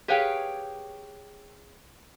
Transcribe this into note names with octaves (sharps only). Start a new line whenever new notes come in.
G4 G#4 B4 C#5 F5 G5